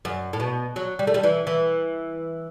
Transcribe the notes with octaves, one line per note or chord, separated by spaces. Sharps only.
F#2
A2
B2
F#3
G3
A3
G3
E3
E3